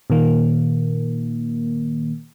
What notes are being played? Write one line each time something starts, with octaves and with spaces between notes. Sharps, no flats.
A#2 D#3 A#3